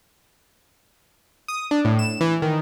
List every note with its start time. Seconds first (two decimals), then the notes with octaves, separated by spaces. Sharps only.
1.48 D#6
1.71 D4
1.85 A2
1.99 E7
2.21 E3
2.42 D#3